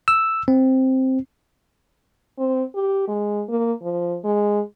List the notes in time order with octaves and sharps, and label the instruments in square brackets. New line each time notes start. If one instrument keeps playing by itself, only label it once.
[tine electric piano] E6
C4
[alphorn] C4
G4
G#3
A#3
F3
G#3